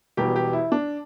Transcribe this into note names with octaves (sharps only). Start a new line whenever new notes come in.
E1 E2 B2 G3 G4
G4
E4
D4